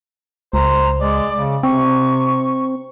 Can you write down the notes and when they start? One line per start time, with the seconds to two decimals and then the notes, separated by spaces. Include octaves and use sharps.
0.53 C#2 C5 A#5
0.99 G#3 D5
1.36 C#3
1.63 C3 C4 C#6